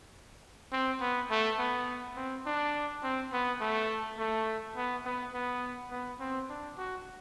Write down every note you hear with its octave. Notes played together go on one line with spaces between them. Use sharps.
C4
B3
A3
B3
C4
D4
C4
B3
A3
A3
B3
B3
B3
B3
C4
D4
F#4